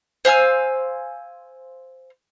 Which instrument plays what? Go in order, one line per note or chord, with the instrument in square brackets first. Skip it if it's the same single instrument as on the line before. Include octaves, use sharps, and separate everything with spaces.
[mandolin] C5 F5 G#5 E6